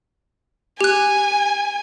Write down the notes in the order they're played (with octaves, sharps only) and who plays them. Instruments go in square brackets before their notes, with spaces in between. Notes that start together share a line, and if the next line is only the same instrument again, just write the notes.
[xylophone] G4 F#6 [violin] G#5